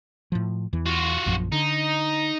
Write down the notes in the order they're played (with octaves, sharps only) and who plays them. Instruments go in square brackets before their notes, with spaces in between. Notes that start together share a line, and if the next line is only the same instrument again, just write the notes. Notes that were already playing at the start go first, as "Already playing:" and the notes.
[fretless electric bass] A2 F3
E2 E3
[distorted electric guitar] F4 F#4
[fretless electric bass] A#1 F#2 F3
[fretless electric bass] D3 [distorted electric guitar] D#4